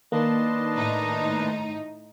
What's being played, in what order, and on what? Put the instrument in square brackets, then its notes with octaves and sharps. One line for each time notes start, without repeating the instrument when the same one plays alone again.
[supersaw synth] D#3 A5 C6 [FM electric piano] A#3 [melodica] D4 B4 D#5
[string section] A2 D#4